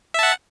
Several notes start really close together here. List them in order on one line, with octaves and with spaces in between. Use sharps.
E5 A5 F#5